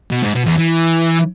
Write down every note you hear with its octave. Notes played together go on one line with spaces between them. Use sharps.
B2
G#2
B2
E2
E3